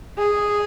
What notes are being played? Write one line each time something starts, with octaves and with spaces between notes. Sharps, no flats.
G#4